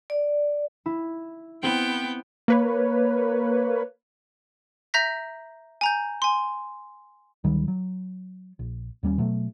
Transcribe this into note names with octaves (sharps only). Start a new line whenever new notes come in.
D5
E4
B3 C4 E4 G5
A#3 B4 C#5
E5 A#5 G6 A#6 B6
G#5 A#5 G6
G#5 C6
D2 D#3 F#3 G3
F#3
A#1
D#2 G3 A#3 C#4
B2 F#3 A3